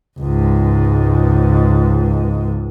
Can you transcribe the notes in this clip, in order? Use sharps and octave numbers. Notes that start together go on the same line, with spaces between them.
C#2 G#2